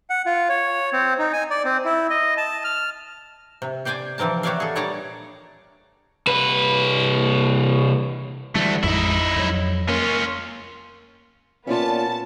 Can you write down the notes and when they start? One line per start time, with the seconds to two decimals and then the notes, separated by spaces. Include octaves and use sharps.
0.10 F#5
0.26 F4
0.49 C#5
0.93 C4
1.19 D#4
1.33 G#5
1.51 D5
1.65 C4
1.85 E4
2.10 D#5
2.38 A5
2.64 F6
3.62 C3
3.85 G4 C5 D5 G5 G#5
4.18 E3 F3 C4 A#4 A5
4.43 F#4 G4 C#5 D5 E5 F5
4.60 G#4 A4
4.75 A#2 G3 C#5 D5 A5 A#5
6.27 C2 B4
8.55 D2 E3 G3 A3
8.83 A1 F2 G#3 D#4 E4
9.36 F2 F#3
9.89 A#3 C#4 F4
11.67 A#2 B3 C#4 F4 D5 E5 A5